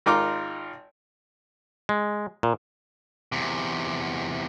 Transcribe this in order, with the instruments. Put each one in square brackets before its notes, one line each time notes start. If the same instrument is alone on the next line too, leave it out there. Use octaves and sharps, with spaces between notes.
[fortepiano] G#1 D#4 F4 A#4 C6 D6
[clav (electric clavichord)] G#3
A#2
[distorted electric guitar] E2 C3